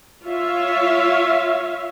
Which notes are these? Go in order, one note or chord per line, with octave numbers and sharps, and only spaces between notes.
F4 C#5 E5 F5